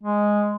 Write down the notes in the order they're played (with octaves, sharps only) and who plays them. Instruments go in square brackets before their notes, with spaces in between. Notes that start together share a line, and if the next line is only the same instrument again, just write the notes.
[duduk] G#3